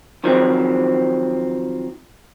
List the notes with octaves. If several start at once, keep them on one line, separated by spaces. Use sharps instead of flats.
D#3 F3 F#3 C4